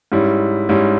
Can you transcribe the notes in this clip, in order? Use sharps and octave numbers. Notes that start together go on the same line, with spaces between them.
G#2 G3 C#4 E4
G#2 G3 C#4 E4